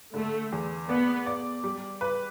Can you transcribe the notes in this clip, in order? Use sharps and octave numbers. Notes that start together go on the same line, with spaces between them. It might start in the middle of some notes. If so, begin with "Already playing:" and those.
D3 A3
E2
B3 D5
D5
G3
B4